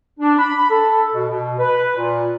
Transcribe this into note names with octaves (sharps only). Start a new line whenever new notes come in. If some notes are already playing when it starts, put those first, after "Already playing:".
D4
B5
A4
B2
B2
B4
A#2